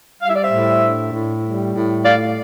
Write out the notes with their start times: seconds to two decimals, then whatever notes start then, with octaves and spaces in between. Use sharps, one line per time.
0.20 G3 F5
0.28 E5
0.35 D5
0.42 C5 E5
0.51 A2
0.82 D4
1.12 A2
1.42 G3
1.74 A2
2.04 A3 D5 F5